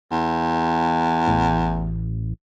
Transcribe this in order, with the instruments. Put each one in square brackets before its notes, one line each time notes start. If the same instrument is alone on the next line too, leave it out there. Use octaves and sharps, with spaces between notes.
[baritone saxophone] E2
[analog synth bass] A1